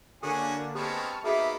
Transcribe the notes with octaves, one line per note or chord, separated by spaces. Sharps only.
D3 A#3 C#4 D4 F#4 G#4 A4
G#3 B3 C4 G4 A4 A5 C#6 F6
A#3 B3 D#4 F#4 G#4 A4 E5